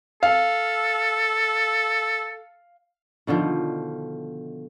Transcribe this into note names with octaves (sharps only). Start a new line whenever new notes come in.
A4 F5
B2 D3 D#3 F3